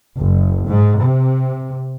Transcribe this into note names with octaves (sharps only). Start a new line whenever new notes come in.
F#1
G#2
C3